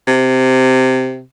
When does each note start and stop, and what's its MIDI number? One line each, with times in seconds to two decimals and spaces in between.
0.08 1.22 48